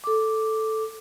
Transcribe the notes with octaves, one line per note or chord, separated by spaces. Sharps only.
A4 D6